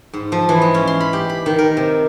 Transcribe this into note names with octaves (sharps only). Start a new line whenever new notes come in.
G#2
F3
E3
G#3
C#4
C6
B5
G4
B5
D#3
A#4
C3